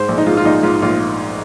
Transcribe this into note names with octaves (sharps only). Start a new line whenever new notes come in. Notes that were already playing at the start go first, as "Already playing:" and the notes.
Already playing: G#2 C5
A#1
D#4
G#3 F4
F4
A#1 D#4
G#2 F4
A#1 F4